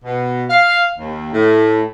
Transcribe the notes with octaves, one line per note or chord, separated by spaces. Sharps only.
B2
F5
D#2
A2